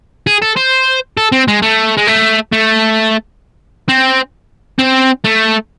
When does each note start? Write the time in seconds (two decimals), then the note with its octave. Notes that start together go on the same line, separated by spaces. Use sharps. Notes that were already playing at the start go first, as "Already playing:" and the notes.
0.27 G#4
0.42 A4
0.57 C5
1.18 A4
1.32 C4
1.48 G#3
1.62 A3
1.97 G#3
2.07 A3
2.53 A3
3.89 C4
4.79 C4
5.24 A3